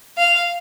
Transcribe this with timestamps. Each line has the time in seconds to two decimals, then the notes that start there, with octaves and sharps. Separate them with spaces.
0.18 F5